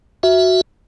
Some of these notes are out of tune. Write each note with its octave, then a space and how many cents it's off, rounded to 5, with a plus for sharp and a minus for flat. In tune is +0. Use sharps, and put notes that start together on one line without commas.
F#4 +0 E5 +0